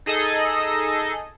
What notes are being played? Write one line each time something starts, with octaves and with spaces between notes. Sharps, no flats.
D#4 G#4 A4 D#5